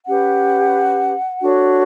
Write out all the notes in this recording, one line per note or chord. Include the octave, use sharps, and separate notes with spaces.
C#4 G4 B4 F#5
D4 F#4 A4 C#5